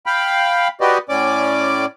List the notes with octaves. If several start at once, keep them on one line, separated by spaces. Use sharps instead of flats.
F5 G5 B5
F#4 G4 B4 D5 D#5
A2 C#4 D5 D6